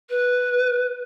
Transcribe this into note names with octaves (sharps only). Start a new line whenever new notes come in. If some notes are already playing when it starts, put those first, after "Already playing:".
B4